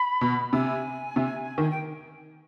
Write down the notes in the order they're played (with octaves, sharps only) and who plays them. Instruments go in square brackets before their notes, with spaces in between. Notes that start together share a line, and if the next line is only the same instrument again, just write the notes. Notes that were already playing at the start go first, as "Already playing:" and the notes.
Already playing: [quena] B5
[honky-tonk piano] B2
[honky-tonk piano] C3 [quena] G#5
[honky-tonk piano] C3
D#3
[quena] G5